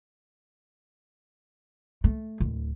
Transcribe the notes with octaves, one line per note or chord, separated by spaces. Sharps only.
A3
D1